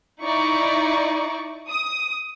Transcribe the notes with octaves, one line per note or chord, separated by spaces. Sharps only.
D#4 E4 D5 C#6
D#6